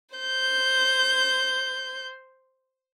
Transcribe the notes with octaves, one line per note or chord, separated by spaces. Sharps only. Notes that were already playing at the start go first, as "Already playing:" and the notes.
C5 G6